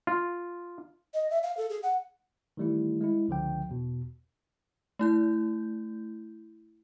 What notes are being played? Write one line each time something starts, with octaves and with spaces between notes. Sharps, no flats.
F4
D#5
E5
F5
A4
G#4
F#5
D#3 E3 G3 A3 E4
G#3 E4
C#2 D3 F3 G5
E2 B2
A3 E4 G6